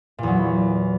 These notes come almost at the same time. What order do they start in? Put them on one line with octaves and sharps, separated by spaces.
A#2 E2 F#3